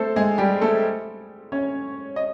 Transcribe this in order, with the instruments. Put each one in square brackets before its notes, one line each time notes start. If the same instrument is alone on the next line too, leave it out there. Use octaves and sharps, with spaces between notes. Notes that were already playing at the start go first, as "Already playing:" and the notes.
Already playing: [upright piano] A3 C4 A4 C5
G#3 G#4
G3 G4
A3 A4
C#4 C#5
D#5